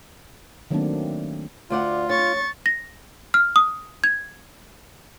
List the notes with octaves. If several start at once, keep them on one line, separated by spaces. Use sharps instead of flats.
D#3 F#3 A3 A#3 C4 D4
D2 F4 D5 F#5
C#5 C#6 A6
A#6
F6
D#6
G#6